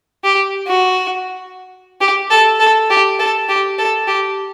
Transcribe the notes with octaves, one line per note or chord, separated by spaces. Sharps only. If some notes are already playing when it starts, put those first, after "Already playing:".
G4
F#4
G4
A4
A4
G4
A4
G4
A4
G4